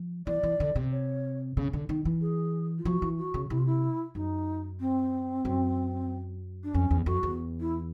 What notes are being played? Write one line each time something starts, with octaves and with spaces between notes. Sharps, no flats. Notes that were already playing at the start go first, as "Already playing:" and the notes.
Already playing: F3
E3 D5
E3
D3
C3
C#5
C#3
D3
D#3
E3
G#4
F4
F3 F#4
E3
F#4
C#3
C3 E4
F4
E4
F#2 D#4
C4
F#2
D4
F2 C#4
E2
F2 F#4
E2
E4